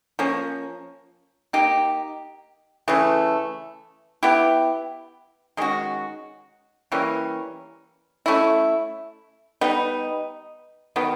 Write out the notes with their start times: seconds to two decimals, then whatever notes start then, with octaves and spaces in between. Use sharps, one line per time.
0.19 F3 A#3 C#4
1.53 A#3 D#4 G4
2.88 C#3 E3 A3
4.23 B3 E4 G4
5.57 D#3 G#3 C#4 F#4
6.92 E3 G3 A#3 C#4
8.26 A3 C#4 E4
9.61 G3 B3 D#4
10.96 D#3 F#3 B3